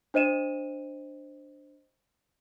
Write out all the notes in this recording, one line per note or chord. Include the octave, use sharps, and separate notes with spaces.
D4 C5 D#5 D#7 E7